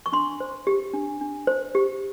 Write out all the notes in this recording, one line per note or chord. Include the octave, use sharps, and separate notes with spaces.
C#6
D4 C6
C5
G4
D4
D4
C5
G4